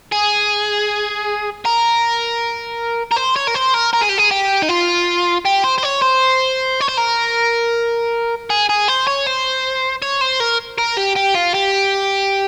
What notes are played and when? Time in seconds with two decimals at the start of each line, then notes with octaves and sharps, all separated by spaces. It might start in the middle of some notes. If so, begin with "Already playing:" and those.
0.12 G#4
1.65 A#4
3.12 A#4
3.17 C5
3.36 C#5
3.48 A#4
3.55 C5
3.74 A#4
3.94 A#4
4.02 G#4
4.09 G4
4.18 G#4
4.31 G4
4.63 D#4
4.69 F4
5.45 G4
5.64 C5
5.78 C5
5.83 C#5
6.02 C5
6.81 C#5
6.89 C5
6.98 A#4
8.50 G#4
8.69 G#4
8.88 C5
9.07 C#5
9.26 C5
10.02 C#5
10.21 C5
10.40 A#4
10.78 A#4
10.97 G4
11.16 G4
11.35 F4
11.55 G4